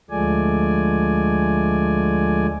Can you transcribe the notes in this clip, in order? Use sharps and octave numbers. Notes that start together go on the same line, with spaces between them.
D2 F3 G#3 A3 D5 G#5